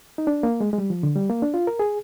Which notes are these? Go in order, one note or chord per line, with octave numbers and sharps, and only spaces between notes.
D#4
D4
A#3
G#3
G#3
G3
F3
D3
G3
A#3
D4
F4
A#4
G#4